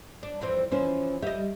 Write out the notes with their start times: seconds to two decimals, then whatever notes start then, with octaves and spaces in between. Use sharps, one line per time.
0.23 D4
0.41 F2 E3 C4
0.72 E3 F3 C#4 E4 C5
1.22 G3 D#5 E5